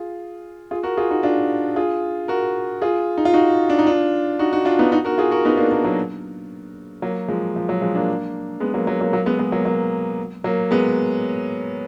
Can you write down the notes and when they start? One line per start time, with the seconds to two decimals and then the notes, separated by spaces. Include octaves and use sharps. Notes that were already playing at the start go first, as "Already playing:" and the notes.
Already playing: F4 G#4
0.71 F4 G#4
0.83 F#4 A#4
0.97 F4 G#4
1.11 D#4 F#4
1.23 D4 F4
1.76 F4 G#4
2.28 F#4 A#4
2.82 F4 G#4
3.18 D#4
3.25 F4
3.34 D#4 F#4
3.69 D4
3.79 D#4
3.86 D4 F4
4.39 D#4 F#4
4.53 D#4 F#4
4.65 D4 F4
4.79 B3 D#4
4.92 D#4 F#4
5.05 F#4 A#4
5.18 F4 G#4
5.31 F#4 A#4
5.45 B3 D#4
5.57 A#3 D4
5.71 A#3 D4
5.84 F#3 A#3
7.02 F#3 A#3
7.28 F3 G#3
7.56 F3
7.69 F#3
7.81 F3 G#3
7.95 A#3 D4
8.60 G#3 B3
8.74 F#3 A#3
8.87 F#3 A#3
9.00 F#3 A#3
9.13 F#3 A#3
9.26 G#3 B3
9.39 G#3 B3
9.52 F#3 A#3
9.65 F#3 A#3
10.44 F#3 A#3
10.71 G#3 B3